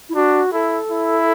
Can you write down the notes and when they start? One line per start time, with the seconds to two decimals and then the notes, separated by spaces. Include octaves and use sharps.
0.09 E4
0.14 D4 F#4
0.52 E4 A4
0.90 E4